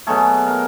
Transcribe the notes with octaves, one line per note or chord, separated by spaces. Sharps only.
B2 F#3 A3 G#4
A#4